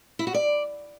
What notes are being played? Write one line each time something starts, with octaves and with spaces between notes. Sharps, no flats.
E4
F#4
D5